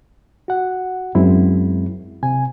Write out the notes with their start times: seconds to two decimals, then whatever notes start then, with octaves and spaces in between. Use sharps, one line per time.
0.48 F#4 F#5
1.15 F#2 G#3 C4 E4
2.23 C3 G#5